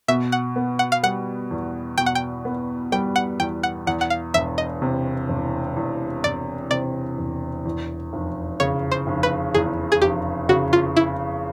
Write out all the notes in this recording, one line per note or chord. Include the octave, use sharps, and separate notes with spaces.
B2 E5
F#5
B3
F#5
F5
G3 F#5
E2
B2 G5
F#5
G5
B3
G3 G5
F#5
E2 G5
F#5
E2 F#5
F#5
F5
E1 E5
D#5
C3
E1
E2
E1 D5
C3 D5
E1
E2
F1
C#3 C#5
C5
F1
B4
E2 G#4
G#4
F1 G4
C#3 F#4
F4
E4